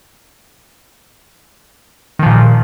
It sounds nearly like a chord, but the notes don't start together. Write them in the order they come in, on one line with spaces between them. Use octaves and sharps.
D#3 F3 A#2